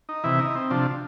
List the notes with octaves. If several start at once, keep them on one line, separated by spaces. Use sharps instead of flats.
D#4
C3 E3 E4
D#4
C4
C3 F3 D4